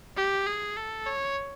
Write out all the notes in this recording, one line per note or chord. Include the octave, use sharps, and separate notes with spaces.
G4
G#4
A4
C#5